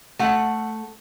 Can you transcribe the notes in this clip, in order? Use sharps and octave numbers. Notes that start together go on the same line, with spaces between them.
A3 F#5